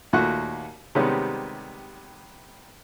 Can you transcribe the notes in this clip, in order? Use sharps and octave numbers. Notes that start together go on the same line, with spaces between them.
D#2 A#2 A3 F#4 F#5 C#6
C3 D#3 G3 G#3 B3 C#4